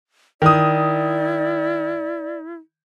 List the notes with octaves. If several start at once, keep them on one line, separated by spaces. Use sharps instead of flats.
D#3 E4 D5 D#6